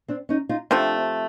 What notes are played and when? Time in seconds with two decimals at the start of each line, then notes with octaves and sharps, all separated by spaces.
0.08 C4 D4
0.29 C#4 D#4
0.49 D#4 F4
0.70 C3 F3 A3 C4 D4